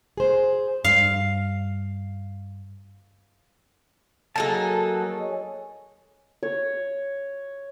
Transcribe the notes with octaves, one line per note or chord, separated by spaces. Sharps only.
G#4 C5
G2 F5
F#3 A3 A#3 D#4 G#4 A4 A5
C#5
C#5